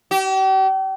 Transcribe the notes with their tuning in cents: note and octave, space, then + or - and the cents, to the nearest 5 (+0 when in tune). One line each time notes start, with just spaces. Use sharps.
G4 -40